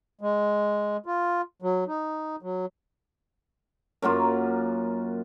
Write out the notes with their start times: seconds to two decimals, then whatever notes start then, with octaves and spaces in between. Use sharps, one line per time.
0.21 G#3
1.06 F4
1.62 F#3
1.88 D#4
2.42 F#3
4.02 F#2 F#3 A#3 F4